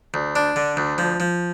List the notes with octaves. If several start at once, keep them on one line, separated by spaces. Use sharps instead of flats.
D2
D4
D3
D2
F3
F3